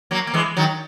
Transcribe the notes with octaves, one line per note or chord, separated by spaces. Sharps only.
F#3 A#3
A#3
E3 G#3
D#3 F#3